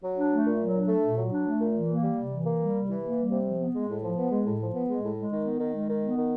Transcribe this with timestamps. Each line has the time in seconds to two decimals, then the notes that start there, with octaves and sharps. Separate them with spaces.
0.03 F#3
0.17 D4
0.32 A3
0.46 A#2
0.60 F#3
0.75 D4
0.88 A3
1.03 A#2
1.17 F#3
1.32 D4
1.46 A3
1.60 A#2
1.74 E3
1.88 A#3
2.03 G3
2.17 C3
2.31 E3
2.45 A#3
2.60 G3
2.74 C3
2.89 E3
3.03 A#3
3.17 G3
3.31 C3
3.45 F3
3.59 B3
3.74 G#3
3.89 A2
4.03 F3
4.17 B3
4.31 G#3
4.46 A2
4.60 F3
4.74 B3
4.88 G#3
5.03 A2
5.17 G#3
5.31 D#3
5.45 B3
5.60 D#3
5.74 G#3
5.89 D#3
6.02 B3
6.17 D#3